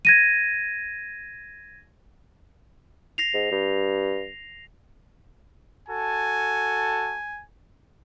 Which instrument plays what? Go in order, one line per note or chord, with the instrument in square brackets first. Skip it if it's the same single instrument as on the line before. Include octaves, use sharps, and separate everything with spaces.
[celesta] G#6 A#6 D#7
[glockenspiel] A#6 C7 F7
[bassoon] G#2
G2
[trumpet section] F#4 A4 A5 [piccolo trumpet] G#5